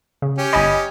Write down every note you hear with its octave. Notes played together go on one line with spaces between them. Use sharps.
C#3
C#4 G4
G1 D#5 G#5 B5